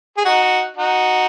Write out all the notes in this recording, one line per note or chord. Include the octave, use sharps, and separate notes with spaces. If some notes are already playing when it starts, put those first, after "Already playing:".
G#4
D#4 F#4
D#4 F#4